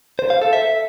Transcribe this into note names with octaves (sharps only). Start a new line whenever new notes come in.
C5
F5
A4
E5